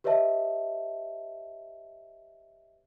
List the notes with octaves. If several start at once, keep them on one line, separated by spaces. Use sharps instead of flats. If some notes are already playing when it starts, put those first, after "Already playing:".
G4 B4 C#5 D#5 E5 A5